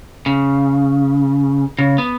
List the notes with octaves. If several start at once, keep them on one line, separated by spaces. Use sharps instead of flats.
C#3
C#3
B3